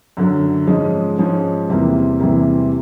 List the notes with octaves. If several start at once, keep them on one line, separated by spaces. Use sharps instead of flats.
F#2 D3 F#3
G#2 F3 G#3 C#4
G#2 F3 G#3 C#4
E2 C3 E3 G3 A#3
E2 C3 E3 G3 A#3